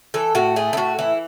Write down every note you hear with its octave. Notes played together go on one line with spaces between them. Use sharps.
E3 A4
A2 F#4
A3 G#4
E4
A2 F#4
E3 E4